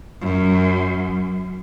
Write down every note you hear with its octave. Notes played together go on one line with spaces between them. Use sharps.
F#2